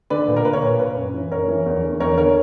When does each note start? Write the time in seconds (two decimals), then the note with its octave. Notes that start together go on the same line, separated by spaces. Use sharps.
0.10 D3 B4 D5
0.28 A#2
0.36 A#4
0.45 B4
0.53 A#4 C#5
0.62 A#2 B4
0.79 B4
0.97 F#2
1.14 E3
1.31 F#2 A#4 C#5
1.48 E3
1.66 E2
1.83 D3
2.00 E2 A#4 C#5
2.18 D3 A#4 C#5